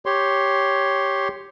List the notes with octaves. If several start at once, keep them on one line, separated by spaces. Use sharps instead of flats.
G4 C#5 C6